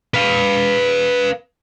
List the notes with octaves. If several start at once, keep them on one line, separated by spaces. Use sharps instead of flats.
B4 F5